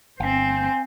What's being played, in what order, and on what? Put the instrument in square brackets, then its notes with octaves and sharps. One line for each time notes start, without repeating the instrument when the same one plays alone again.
[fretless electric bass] G1 [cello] C4 C5 [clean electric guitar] F5 G#5